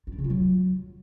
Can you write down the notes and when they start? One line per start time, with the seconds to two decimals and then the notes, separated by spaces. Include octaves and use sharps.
0.07 F4
0.13 D4
0.18 C#3
0.24 F4
0.30 F#3